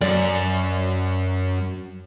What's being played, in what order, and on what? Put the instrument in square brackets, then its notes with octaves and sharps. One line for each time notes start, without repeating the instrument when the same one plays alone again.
[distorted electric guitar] F#2 [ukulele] D5